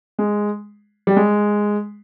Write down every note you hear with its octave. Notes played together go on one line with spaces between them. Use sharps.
G#3
G3
G#3